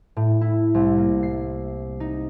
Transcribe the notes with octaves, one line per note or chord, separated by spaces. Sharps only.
A2
E4
C2
A#3
C7
D#4